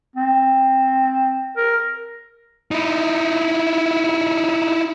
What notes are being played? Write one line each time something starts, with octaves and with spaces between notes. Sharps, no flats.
C4
A#4
D#4 E4